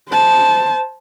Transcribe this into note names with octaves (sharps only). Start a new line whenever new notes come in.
C5 A5